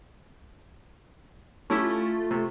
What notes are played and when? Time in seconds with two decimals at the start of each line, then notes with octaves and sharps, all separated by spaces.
1.70 A3 C#4 E4 G4
1.83 F4
2.31 C3